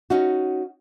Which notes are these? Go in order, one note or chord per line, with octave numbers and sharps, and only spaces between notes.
C#4 D#4 F#4